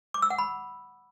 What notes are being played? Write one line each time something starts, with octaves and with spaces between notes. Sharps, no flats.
D6
E6
F#5
B5